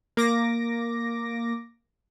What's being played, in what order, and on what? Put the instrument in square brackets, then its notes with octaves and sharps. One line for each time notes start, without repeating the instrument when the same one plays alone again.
[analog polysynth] A#3 D6 A#6